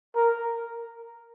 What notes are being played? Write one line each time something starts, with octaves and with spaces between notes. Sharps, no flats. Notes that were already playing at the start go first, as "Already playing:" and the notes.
A#4